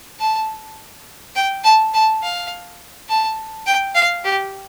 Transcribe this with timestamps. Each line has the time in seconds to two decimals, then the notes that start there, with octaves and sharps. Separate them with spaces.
0.20 A5
1.35 G5
1.64 A5
1.94 A5
2.22 F5
3.08 A5
3.66 G5
3.95 F5
4.24 G4